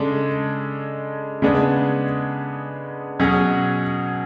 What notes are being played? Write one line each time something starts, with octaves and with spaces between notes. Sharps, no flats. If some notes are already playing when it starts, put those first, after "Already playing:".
Already playing: C#3 G#3 D4 A4
C#3 G#3 B3 D4 G#4
B2 F#3 C#4 G#4